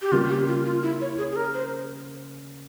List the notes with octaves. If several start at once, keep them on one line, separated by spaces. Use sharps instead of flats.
G4
C#3 G3 A#3 F4
G4
F4
F4
E4
C#5
G#4
G#4
A#4
C5